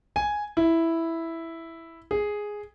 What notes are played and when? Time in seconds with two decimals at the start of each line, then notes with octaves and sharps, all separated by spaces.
0.16 G#5
0.57 E4
2.11 G#4